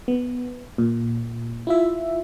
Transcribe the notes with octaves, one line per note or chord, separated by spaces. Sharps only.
B3
A#2
E4 F4 E5